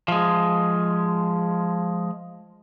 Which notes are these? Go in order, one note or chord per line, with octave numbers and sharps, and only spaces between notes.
F3 G#3